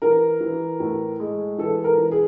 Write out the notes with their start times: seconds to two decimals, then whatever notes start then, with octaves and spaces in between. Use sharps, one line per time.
0.02 E3 A#4
0.40 E3
0.80 A2
1.20 G#3
1.58 E3 A4
1.84 A#4
1.98 E3
2.11 G#4